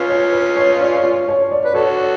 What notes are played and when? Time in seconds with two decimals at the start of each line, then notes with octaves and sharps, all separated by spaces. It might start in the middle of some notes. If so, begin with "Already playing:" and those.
Already playing: C#4 F4 B4
0.09 C#5
0.33 B4
0.57 C#5
0.80 D5
1.04 C#5
1.28 C#5
1.51 D5
1.65 B4
1.75 F#4 A4 C#5